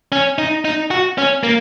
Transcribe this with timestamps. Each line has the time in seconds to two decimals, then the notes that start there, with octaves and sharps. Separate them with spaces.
0.12 C#4
0.38 D#4
0.65 D#4
0.91 F#4
1.18 C#4
1.43 A#3